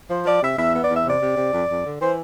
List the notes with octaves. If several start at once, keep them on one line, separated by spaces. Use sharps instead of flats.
F3 C5
F3 D5
C3 E5
E2 E5
B3
D5
E2
E5
C3 D5
C3
C3
F2
F2
D3
E3 C5